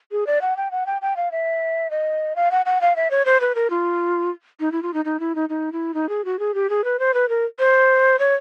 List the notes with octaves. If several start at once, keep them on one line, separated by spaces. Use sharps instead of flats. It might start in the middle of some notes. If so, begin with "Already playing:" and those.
G#4
D5
F#5
G5
F#5
G5
G5
F5
E5
D#5
F5
F#5
F#5
F5
E5
C#5
C5
B4
A#4
F4
D#4
E4
F4
D#4
D#4
E4
D#4
D#4
E4
D#4
G#4
F#4
G#4
G4
G#4
B4
C5
B4
A#4
C5
C#5